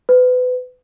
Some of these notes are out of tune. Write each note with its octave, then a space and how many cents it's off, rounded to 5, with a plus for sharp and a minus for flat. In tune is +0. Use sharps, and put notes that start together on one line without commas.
B4 +30